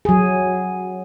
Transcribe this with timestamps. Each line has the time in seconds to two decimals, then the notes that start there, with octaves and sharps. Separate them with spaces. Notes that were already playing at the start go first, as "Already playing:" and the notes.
0.05 F#3 G#4